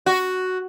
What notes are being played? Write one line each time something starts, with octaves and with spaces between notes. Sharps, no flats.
F#4